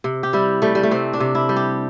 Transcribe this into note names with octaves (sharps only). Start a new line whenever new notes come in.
C3
G4
G3 E4
G3 A3
G3
A3
C3 C4
D4
C3
E4
G3
G4